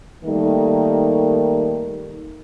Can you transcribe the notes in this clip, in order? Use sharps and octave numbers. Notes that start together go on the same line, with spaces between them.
D#3 G3 A3 A#3 D#4